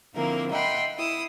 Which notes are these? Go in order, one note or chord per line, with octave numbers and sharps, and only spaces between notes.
D3 F3 A#3 C4 E4 A#4
D#5 E5 F#5 G5 B5 C6
E4 D#6 E6